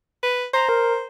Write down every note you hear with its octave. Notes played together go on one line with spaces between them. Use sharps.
B4
C5 A#5
A#4